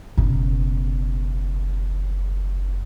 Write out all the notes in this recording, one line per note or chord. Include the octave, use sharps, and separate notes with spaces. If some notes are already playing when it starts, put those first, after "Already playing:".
F#1 B2